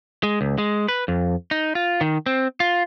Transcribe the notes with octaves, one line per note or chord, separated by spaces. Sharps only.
G#3
C#2
G#3
B4
F2
D#4
F4
D#3
C4
F4